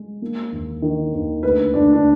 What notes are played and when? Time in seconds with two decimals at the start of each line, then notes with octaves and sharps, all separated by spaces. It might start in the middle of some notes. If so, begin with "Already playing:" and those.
Already playing: G#3
0.22 A#3
0.52 D#2
0.82 D#3
1.13 D#2
1.43 D2 B4
1.74 D2 D4
1.93 D4